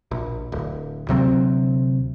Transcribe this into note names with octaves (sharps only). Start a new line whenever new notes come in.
A#1
D1
D2 C3 F#3 C4